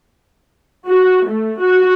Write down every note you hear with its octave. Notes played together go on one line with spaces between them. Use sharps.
F#4
A3
F#4